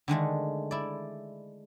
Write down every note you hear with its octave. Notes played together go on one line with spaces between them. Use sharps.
D3 D#3 G#3 A3
E4 D5